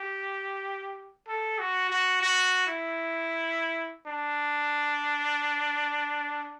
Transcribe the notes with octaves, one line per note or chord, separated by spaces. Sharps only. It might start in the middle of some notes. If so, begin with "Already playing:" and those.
Already playing: G4
A4
F#4
F#4
F#4
E4
D4